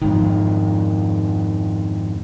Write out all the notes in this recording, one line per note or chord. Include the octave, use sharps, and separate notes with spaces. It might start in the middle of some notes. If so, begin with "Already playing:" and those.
F2 G#2 D#3